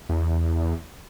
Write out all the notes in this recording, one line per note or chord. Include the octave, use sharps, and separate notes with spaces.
E2